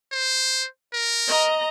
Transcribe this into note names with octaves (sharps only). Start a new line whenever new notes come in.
C5
A#4
D#5 A#5